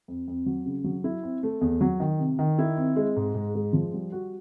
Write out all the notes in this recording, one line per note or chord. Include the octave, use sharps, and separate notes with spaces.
F2
F2
F#3
C#3
F#3
E4
C4
A3
E2
F#3
D#3
C3
D#3
E4
C4
G#3
G#2
G#2
G#3
F3
G3
F#4